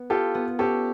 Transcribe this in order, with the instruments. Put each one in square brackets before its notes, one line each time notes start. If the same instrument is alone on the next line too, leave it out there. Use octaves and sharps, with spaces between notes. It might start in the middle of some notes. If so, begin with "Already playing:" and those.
Already playing: [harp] B3
[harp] F4 [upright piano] G4 A4
[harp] B3
[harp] C#4 [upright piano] G4 A4